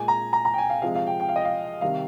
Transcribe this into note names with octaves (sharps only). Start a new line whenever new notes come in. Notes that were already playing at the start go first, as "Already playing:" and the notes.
Already playing: A#2 G#3 G#5
A#5
A#5
A#5
G5
G#5
F5
C3 F3 G#3 F5
F5
G5
G5
F5
D#5
F5
C3 D#3 G3 F5